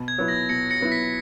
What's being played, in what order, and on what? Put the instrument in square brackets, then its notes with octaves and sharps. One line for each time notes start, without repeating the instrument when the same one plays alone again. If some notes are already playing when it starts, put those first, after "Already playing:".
Already playing: [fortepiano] B2
[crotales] G#6
[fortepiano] F#3 B3 E4
[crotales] A#6
[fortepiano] B2 [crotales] A#6 C#7
[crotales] A#6 C#7
[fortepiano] F#3 B3 E4
[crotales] B6